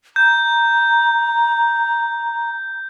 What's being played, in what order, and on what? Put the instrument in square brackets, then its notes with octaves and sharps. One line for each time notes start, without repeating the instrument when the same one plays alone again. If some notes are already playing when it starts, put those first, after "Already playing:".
[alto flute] A#5 [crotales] G6